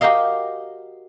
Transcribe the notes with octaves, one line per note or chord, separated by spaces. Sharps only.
F#4 G4 A#4 D#5 F5